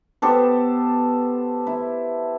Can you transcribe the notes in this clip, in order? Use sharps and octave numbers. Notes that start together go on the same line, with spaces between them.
B3 G4 A4 C5
E4